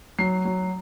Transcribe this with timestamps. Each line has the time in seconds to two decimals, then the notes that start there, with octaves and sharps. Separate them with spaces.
0.19 F#3 C7
0.45 F#3